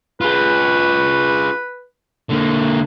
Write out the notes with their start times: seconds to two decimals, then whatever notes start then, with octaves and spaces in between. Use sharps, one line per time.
0.21 F4 G#4 B4
2.30 D3 A#3